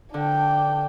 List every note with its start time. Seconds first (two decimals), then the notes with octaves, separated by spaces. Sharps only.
0.14 D3 D4 G5